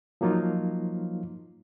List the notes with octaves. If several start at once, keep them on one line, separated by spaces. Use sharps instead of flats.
F3 F#3 A#3 D#4 F4